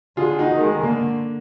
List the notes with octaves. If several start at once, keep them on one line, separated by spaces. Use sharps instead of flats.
D3 F4 G#4
D#4 F#4
D#3
G#3
G#3
D3 A#3